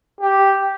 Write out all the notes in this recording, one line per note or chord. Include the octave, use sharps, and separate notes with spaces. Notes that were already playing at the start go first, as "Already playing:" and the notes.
G4